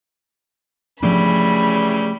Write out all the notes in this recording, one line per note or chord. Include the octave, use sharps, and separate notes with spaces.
C#3 E3 F3 G3 A3 D4 B5